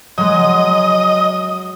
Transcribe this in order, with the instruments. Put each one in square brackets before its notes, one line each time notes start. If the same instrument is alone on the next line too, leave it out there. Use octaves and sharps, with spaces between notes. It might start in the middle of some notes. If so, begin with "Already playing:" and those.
[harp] F#3 G#3 [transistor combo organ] D#5